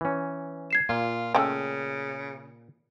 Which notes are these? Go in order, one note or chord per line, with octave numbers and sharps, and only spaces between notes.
E3 C#4
G#6 C7 E7
A#2 F4
C#3 A3 C#4 G5 E6